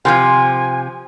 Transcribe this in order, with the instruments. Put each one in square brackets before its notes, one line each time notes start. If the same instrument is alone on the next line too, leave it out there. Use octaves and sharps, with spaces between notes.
[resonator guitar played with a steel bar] C3 E3 F3 [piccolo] G#5